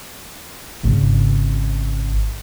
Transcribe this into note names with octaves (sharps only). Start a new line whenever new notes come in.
G#1 C#3